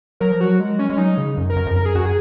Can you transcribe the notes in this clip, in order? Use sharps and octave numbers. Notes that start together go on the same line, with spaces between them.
F#3 A#4
F3
F#3 F#4
G#3
C#4
G#3 C#4
F#3 D#4
C#3
F#2
A#4
F#2
F2
F#2 A#4
G#4
F#2 F#4
G#4